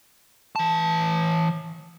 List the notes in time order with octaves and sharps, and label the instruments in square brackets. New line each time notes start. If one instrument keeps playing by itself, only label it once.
[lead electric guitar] E3 A5